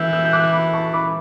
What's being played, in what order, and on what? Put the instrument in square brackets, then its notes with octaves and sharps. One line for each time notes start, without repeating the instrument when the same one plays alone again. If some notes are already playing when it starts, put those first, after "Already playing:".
Already playing: [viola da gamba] E3 [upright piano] E6 G6
[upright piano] E6 G6
G6
D6 F#6
B5 D6
A5 C#6
B5 D6